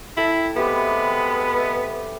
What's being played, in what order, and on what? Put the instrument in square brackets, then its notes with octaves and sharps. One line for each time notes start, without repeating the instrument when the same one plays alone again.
[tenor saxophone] E4 [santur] A4 G5
[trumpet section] G#3 E5 B5 [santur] A3 C4 G4 [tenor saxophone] B3